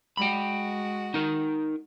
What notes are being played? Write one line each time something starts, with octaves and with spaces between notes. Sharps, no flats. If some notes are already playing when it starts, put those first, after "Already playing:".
G#3 F#4 G5 B5
D#4 A#4